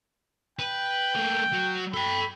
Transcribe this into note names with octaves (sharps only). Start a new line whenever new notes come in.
B4 G5
A3 A#3
F#3
A4 G5 B5